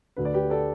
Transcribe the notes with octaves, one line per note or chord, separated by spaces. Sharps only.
D2 D3 B4
D5
G4 B4
A4 D5